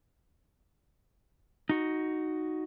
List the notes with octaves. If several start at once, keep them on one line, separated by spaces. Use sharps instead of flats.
D#4 F#4